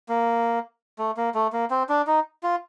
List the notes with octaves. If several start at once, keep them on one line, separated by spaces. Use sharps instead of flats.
A#3
A3
A#3
A3
A#3
C4
D4
D#4
F4